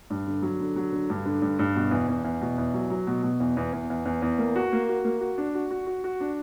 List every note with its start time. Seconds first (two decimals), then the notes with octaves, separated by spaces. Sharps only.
0.10 G2
0.27 D3
0.42 F#3
0.60 D3
0.76 F#3
0.92 D3
1.10 G2
1.26 D3
1.42 G2
1.59 G2
1.76 B2
1.91 E2
2.08 E2
2.24 E2
2.41 B2
2.58 E2
2.74 F#3
2.90 F#3
3.07 B2
3.23 B2
3.40 E2
3.57 E2
3.73 E2
3.90 E2
4.05 E2
4.22 E2
4.38 A#3
4.56 F#4
4.72 A#3
4.89 F#4
5.04 A#3
5.21 F#4
5.38 D4
5.55 F#4
5.71 F#4
5.87 F#4
6.04 F#4
6.20 D4